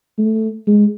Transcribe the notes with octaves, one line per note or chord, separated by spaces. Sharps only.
A3
G#3